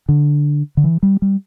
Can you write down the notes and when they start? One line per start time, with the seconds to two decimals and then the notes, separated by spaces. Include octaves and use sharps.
0.09 D3
0.77 D3
0.84 E3
1.03 G3
1.22 G3